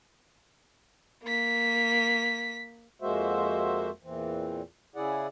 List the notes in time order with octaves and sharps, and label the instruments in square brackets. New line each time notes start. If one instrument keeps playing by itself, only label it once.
[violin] A#3 B6
[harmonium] F2 G#3 A#3 F#4 C5 E5
E2 A#2 E3 C4
C#3 E4 G#4 D5 F#5